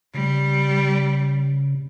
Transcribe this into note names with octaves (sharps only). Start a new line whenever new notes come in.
C#3 G3